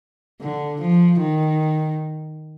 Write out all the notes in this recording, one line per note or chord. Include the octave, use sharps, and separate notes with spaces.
D3
F3
D#3